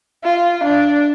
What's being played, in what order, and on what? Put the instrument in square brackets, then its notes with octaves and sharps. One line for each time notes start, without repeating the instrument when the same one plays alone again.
[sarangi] F4
D4